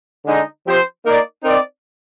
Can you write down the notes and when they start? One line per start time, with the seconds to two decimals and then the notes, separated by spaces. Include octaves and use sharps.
0.26 D3 G#3 D#4
0.65 F3 C4 G4 C5
1.05 A#3 D#4 A#4 D5
1.43 C4 D#4 A#4 D5